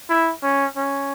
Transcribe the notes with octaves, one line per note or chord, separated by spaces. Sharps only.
E4
C#4
C#4